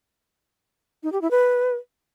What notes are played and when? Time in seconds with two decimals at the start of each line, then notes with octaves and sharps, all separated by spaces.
1.03 D#4
1.12 G4
1.22 E4
1.31 B4